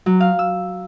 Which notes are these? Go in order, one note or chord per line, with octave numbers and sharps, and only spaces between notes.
F#3
F5
E6